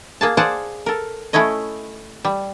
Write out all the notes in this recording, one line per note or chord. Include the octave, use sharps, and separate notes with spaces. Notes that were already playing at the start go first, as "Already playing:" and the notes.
A#3 G#4 A5
G#4 C5 D5 F5 F#5 A5
A4 A#4
A3 C#4 E4 C#5 D#5
G3